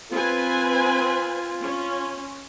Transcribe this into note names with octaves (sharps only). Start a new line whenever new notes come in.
C4 F4 B4 G#5
C#4